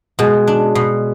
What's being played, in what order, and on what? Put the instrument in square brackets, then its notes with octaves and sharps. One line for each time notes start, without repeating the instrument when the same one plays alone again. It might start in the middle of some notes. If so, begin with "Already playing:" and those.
[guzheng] B2 [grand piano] G#3 G#4
[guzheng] D4
B2